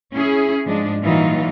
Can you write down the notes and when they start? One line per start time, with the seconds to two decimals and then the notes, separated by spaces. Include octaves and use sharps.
0.12 C#4 E4 G#4
0.65 G#2 F3 G#3 D4
1.02 A#2 E3 F#3 G3 D#4 F4